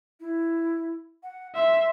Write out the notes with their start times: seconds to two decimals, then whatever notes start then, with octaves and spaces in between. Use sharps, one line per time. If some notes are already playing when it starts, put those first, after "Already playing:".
0.20 E4
1.23 F#5
1.55 E5 C6